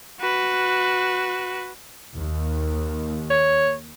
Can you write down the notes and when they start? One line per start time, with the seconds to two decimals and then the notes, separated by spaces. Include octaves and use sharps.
0.20 F#4 B4
2.16 D#2
3.30 C#5